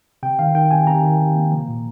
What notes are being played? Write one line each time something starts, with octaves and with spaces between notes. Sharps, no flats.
C3 G5
D#3 F5
D#3 G5
C3 G#5
C3 A#5
D#3
C3
A#3
F3
A#2